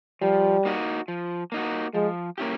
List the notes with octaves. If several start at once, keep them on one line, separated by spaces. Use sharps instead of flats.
F3 G3
A#3 D#4 F#4
F3
A#3 D#4 F#4
F3 G#3
A#3 C#4 E4 G4